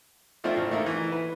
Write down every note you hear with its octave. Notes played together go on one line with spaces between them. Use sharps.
F3 A3 C4 D4 E4 F4
A1
A3 A#3 D#4 E4
E3
B4